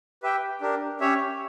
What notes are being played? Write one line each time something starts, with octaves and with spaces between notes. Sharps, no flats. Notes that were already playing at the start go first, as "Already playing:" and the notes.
G4 B4 E5 G5
D4 G4 A#4
C#4 G4 C#5 E5